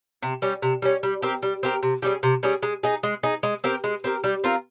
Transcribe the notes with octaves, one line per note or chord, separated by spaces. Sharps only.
C3
G3 C#4
C3
G3 C#4
G3
C4 G4 A#4
G3
C4 G4 A#4
C3
G3 C#4 G#4
C3
G3 C#4 G#4
G#3
D#4 G#4
G#3
D#4 G#4
G#3
C4 G4 A#4
G#3
C4 G4 A#4
G3
C4 F4 A#4